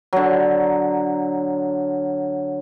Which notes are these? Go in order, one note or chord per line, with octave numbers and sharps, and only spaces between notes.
D3 F#3